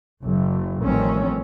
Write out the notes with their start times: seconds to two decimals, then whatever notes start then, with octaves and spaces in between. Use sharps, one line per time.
0.22 F#1
0.83 A1 D#3 F3 G3 C4 C#4